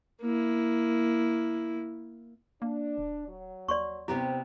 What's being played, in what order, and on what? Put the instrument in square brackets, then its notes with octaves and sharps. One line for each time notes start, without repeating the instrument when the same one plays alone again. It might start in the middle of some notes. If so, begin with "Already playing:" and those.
[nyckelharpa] A#3 E4
[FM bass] A#3 [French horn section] D4
[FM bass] D#1
[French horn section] F#3
[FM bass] D#2 [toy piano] D5 C6 C#6
[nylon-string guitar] C3 B3 G4 [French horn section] C4 [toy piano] E4